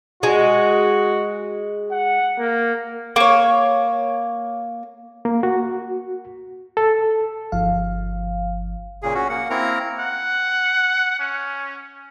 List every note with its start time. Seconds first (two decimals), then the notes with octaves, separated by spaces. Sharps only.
0.23 G#3 F#4
1.91 F#5
2.39 A#3
3.16 A#3 C#5
5.25 A#3
5.43 F#4
6.77 A4
7.52 G1 F3 F5
9.02 A#2 C#3 G#4
9.15 C#4 F#4
9.29 A#3 F#5
9.50 A#3 C4 E4 A#4 A#5
9.99 F#5
11.20 C#4